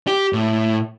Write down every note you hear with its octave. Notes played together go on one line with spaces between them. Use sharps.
G4
A2